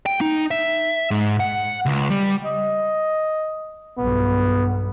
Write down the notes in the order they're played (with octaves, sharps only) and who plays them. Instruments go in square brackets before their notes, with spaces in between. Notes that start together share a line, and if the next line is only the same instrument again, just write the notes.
[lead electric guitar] G5
D#4
E5
G#2
F#5
C#2
G3
[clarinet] D#5
[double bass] B1 G2 [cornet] B3